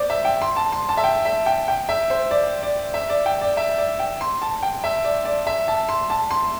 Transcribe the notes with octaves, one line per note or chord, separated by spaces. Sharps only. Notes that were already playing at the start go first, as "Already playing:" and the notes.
Already playing: C5 D5
E5
G5
C6
A5
C6
A5
E5
G5
E5
G5
G5
E5
C5
D5
D5
E5
D5
G5
D5
E5
D5
G5
C6
A5
G5
E5
D5
D5
E5
A5
C6
A5
C6